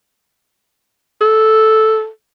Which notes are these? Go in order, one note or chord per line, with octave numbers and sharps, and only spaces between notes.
A4